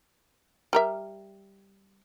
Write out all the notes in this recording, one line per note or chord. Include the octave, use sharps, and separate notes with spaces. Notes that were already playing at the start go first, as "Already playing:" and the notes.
G3 A#4 E5